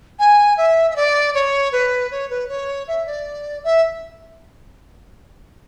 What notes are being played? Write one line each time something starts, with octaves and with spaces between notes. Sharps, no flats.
G#5
E5
E5
D5
C#5
B4
C#5
B4
C#5
E5
D5
E5